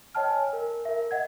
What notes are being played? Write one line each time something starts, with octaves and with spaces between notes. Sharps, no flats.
C#5 D#5 G5 A5 F6
G#5
A#4
A#4 E5
D#5 F#5 G#6